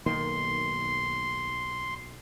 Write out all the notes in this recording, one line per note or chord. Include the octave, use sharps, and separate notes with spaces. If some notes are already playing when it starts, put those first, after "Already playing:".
B1 D#3 A#3 C6